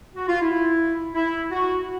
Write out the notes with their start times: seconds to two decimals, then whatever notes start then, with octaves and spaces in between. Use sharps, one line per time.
0.16 F#4
0.29 F4
0.42 E4
1.15 E4
1.52 F#4